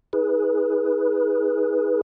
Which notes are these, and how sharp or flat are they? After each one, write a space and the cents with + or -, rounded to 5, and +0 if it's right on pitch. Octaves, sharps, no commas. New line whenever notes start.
D#4 +45 G#4 +0 B4 -20